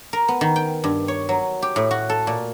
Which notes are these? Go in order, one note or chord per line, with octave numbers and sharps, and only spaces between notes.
A#4
B3
D#3
G5
G2
C#5
F#3
G4
A2
F#4
A4
A#2